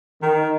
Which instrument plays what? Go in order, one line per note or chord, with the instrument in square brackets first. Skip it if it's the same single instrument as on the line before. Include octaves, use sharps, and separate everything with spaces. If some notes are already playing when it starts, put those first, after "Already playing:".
[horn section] D#3